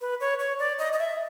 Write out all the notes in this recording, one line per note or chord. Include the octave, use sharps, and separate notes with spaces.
B4
C#5
C#5
D5
D#5
D#5
E5